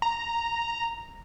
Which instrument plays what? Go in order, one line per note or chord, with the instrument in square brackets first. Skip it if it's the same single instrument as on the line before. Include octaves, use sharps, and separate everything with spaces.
[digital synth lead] A#5